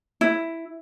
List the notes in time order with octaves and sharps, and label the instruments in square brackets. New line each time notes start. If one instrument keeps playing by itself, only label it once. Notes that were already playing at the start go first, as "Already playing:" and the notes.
[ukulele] E4